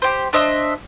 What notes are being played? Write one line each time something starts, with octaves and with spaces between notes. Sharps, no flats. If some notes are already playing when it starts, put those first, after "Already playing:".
G4 C5
D4 C5 D#5 E5